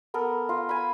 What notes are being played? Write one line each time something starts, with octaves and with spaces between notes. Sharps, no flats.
B3 A4 A#4
F4
G#5 B5